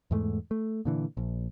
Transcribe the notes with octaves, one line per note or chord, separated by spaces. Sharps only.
E2 G#2 A3
A3
A#2 D3 E3
A#1